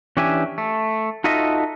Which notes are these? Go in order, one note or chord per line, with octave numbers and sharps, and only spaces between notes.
E3 C#4 D4 G4 E5 G#5
A3
D#4 F4 F#4 A4 D#5 E5